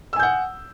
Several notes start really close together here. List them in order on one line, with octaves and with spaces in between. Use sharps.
E6 G#5 G6 F#5